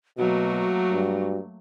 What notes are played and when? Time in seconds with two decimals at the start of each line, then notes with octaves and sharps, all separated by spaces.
0.18 B2 F#3 A3 A#3 F#4
0.92 G2